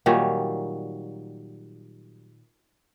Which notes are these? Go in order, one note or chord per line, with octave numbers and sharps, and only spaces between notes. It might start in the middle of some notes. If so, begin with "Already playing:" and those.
A#2 D#3 F#3 G3